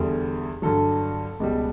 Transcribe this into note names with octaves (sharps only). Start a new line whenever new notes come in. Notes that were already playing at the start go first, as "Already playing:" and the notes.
Already playing: E2 D3 G3
G2 D3 F#3 A4
C#2 B2 G3